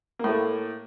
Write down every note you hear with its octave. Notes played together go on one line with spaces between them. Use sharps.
A2 A3 A#3